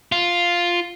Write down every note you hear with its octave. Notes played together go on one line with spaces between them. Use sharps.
F4